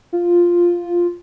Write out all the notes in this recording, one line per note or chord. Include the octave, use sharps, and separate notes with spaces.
F4